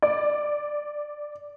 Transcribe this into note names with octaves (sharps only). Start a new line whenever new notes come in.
D5